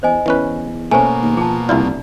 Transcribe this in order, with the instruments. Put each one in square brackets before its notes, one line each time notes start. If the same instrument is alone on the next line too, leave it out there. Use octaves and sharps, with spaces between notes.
[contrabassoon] E2 [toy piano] C5 D#5 G#5
[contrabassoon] E2 [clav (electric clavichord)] E3 C#4 B4
[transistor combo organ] B2 A#3 [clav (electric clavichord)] A3 C#4 [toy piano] C5 G#5
[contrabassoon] D#2
[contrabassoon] F3 [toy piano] G#4 A5
[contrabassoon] F1 [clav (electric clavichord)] C2 E4 F4 [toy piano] D5